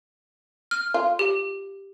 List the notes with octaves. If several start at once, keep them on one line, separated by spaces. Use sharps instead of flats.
F6
F4
G4